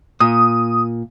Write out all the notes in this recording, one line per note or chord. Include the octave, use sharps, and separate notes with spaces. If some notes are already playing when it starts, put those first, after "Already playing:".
A#2 D#6